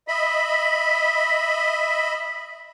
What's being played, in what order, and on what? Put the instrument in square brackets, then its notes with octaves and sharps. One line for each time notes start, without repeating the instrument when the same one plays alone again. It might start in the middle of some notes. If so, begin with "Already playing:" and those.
[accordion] D#5 E5 B5 [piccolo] B6